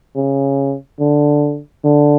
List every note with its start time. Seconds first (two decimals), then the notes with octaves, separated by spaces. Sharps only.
0.15 C#3
1.00 D3
1.84 D3